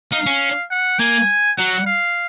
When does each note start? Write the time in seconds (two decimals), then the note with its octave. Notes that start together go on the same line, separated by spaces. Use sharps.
0.12 D#4 F5
0.26 C#4
0.70 F#5
0.99 A#3 G#5
1.58 F#3 F#5
1.87 F5